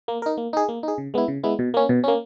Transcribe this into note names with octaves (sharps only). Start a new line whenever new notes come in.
A#3
D#4 A#4
A#3
D#4 G#4
A#3
D#4 G#4
C#3
G#3 B3 E4
C#3
G#3 B3 E4
B2
A#3 C#4
B2
A#3 C#4